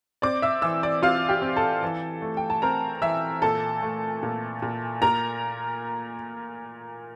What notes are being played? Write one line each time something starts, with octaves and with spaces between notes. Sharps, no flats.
C4 D5 D6
E5 E6
E3 E5 E6
D5 D6
C4 F4 F5
G4 G5
C4
A4 A5
E3
A3
G5
A5
C4 A#4 A#5
E3 E5 E6
A#2 A4 A5
A3
A#2
A#2
A#2 A#4 A#5